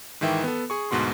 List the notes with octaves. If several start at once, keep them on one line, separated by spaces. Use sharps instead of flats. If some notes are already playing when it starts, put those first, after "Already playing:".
G#2 D#3 E3 E5 G5
B3 A4
G#4 C#6
D2 G#2 B2 F#4 C6